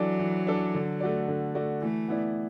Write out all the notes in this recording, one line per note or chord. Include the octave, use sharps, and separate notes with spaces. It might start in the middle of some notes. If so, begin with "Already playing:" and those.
Already playing: E3 F#3 D4 A4 D5
E3
D4 A4 D5
D3
A3 F#4 D5
D3
A3 F#4 D5
E3 A3
B3 E4 D5